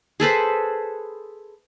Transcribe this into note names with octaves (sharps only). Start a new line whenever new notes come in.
G#4 A4 B4 C5